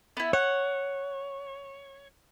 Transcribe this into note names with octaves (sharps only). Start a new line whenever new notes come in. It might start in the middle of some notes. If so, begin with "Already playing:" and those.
B3 E4
C#5 F#5